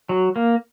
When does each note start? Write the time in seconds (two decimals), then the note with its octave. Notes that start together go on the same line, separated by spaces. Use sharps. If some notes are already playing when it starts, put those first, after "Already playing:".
0.09 F#3
0.36 A#3